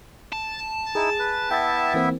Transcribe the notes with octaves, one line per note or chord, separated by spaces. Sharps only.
A5
D#4 E4 G#4
B4
B3 E4 E5 G5 A6
E3 A#3 C4